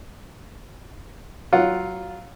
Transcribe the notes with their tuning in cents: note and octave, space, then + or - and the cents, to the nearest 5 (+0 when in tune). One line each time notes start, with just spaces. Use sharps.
F#3 +15 F4 +0 F#5 +0